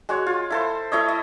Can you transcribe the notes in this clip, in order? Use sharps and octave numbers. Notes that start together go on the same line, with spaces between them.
G#3 F#4 C#5
F4
E4 A4 C5
A3 E4 C#5 D#5
D#5